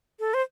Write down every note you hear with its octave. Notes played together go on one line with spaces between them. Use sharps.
A4
C5